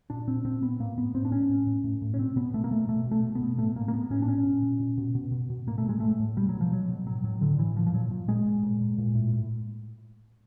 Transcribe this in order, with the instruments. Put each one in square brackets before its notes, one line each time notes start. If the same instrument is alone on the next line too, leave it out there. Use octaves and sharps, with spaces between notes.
[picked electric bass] A#2 D4
A#2 C4
A#2 C4
A#2 B3
A2 A#3
A2 B3
A2 C4
D4
A2 C#4
A2
A2
A2
A2
C#4
B2 C4
B2 B3
B2 A3
A#3
B2 A3
B2 A3
B2
A3
B2
B3
B2
A2 A3
A2 A#3
A#3
A2 B3
A2 C#4
D4
A#2 C#4
A#2
A#2
A#2
B2
B2
B2
B2
A2 A#3
A3
A2 G#3
A2 A3
A2
B2 G3
F#3
B2
F3
B2 F#3
B2
A2 F#3
A2 F#3
A2 D3
A2 E3
A#2 F3
F3
A#2 F#3
A#2
A#2 G#3
A#2
A#2
A#2
A#2
A2
A2